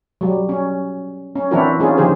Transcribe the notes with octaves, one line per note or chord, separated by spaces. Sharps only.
F#3 G3
C#4
C#4
E3 C4 D4 E4 F#4 A#4
C4 C#4 D#4 F4 G#4
D3 D#3 F3 G4 G#4 C5